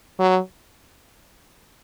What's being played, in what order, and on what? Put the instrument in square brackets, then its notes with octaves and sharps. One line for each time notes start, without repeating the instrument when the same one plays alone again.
[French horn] F#3